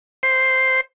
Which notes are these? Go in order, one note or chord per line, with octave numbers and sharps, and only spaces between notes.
C5